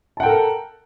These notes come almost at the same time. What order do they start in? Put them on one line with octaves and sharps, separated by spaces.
A5 F#5 G5 A4 A#4